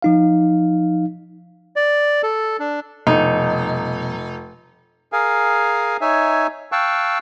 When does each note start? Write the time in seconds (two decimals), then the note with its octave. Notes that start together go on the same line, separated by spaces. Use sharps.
0.02 F3 D#4 F5
1.76 D5
2.23 A4
2.59 D4
3.07 F1 B2 F3 G3 D#4
5.12 G#4 A#4 F5 G#5
6.01 D#4 C#5 E5 G#5
6.72 F5 G5 A5 C#6 E6 F#6